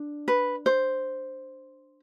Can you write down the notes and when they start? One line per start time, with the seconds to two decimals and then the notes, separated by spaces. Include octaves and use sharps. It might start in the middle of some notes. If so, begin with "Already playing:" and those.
Already playing: D4
0.28 B4
0.66 C5